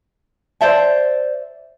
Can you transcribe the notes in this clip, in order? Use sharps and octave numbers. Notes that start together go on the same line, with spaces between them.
C5 D5 E5 A5